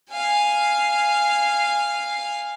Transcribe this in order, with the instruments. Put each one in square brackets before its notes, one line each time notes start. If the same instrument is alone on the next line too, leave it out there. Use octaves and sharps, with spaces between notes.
[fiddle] F5 G#5